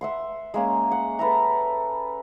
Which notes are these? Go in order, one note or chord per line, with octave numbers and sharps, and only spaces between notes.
E5 F#5 C6
G#3 A#3 C#4
F#5
A4 B4 E5 A#5